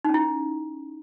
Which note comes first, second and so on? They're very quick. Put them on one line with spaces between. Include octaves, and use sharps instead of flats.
D#4 C#4 E4